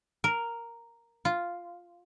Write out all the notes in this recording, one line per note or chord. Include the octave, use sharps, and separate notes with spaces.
A#4
F4